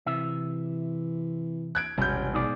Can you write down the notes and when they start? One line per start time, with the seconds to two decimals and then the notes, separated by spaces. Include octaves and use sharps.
0.06 C3 E3 E5
1.75 F#6 G#6 D7
1.98 E1 A1 C3 G3 C#4 G6
2.34 G#2 B2 G#4 D5